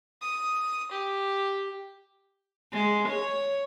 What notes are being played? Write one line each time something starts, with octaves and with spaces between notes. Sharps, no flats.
D#6
G4
G#3
C#5